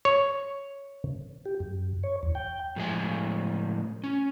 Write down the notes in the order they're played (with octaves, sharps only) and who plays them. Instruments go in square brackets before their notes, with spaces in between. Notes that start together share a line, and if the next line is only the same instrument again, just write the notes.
[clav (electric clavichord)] C#5
[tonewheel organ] G4
F#2
C#5
E2
G5
[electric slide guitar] A2 F3 G#3 D#5 G#5
C#4